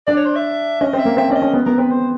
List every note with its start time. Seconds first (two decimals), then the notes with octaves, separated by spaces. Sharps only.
0.07 D4 D5
0.17 C#5
0.25 C5
0.35 E5
0.81 C#4 D#5
0.93 C4
0.99 E5
1.05 A#3
1.17 C4 E5
1.30 C#4 D5
1.35 D#5
1.42 C#4
1.53 B3
1.66 B3 A#4
1.78 C4 B4
1.91 C5